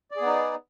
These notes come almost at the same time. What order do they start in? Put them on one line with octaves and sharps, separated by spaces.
D5 G#4 B3 D#4